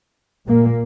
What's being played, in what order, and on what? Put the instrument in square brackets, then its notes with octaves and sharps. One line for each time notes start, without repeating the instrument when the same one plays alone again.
[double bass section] A#2 A#3